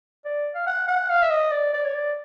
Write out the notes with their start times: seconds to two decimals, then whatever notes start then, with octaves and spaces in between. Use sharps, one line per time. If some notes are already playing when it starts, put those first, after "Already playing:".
0.25 D5
0.55 F5
0.66 F#5
0.88 F#5
1.09 F5
1.22 E5
1.30 D#5
1.51 D5
1.73 D5
1.85 C#5
1.94 D5